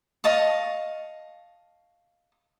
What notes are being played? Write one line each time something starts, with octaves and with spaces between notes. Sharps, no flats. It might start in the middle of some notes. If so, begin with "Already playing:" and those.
D#5 F5 A5 C#6